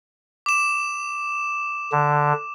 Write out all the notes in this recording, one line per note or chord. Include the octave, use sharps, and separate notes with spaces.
D6 E7
D3